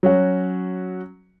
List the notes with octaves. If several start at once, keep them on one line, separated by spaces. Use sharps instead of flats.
F#3 C#4 F#4